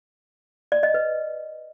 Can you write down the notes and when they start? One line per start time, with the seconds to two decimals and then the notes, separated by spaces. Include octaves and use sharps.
0.72 D5
0.83 D#5
0.94 B4